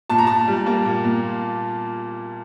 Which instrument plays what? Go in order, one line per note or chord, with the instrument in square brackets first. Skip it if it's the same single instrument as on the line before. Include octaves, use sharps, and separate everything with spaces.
[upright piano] A#2 A5
A#5
A#2 A5
G3
A#3
A#2
A#2